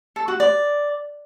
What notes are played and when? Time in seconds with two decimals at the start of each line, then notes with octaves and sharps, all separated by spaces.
0.16 A4
0.28 F#4
0.40 D5